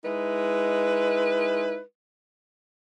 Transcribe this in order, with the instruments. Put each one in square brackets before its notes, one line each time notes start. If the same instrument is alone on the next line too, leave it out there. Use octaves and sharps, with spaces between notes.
[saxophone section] G#3 D#4 E4 B4